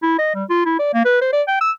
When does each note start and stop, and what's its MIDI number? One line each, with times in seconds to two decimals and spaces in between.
0.03 0.17 64
0.19 0.30 75
0.35 0.44 55
0.50 0.63 65
0.66 0.78 64
0.79 0.88 74
0.94 1.04 58
1.05 1.21 71
1.21 1.29 72
1.33 1.42 74
1.48 1.61 79
1.61 1.71 88